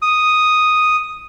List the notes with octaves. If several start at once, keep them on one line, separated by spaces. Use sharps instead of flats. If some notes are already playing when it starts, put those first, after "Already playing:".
D#6